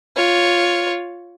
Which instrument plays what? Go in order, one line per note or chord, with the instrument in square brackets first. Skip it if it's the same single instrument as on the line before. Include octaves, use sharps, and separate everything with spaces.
[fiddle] F4 C#5